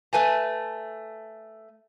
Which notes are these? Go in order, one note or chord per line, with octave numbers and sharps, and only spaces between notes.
A3 B4 G#5 A5